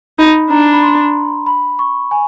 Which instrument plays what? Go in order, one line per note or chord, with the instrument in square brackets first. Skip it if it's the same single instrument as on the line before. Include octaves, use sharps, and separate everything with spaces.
[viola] D#4 [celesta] B5
[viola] D4 [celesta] A#5
[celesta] B5
C6
B5
C#6
G#5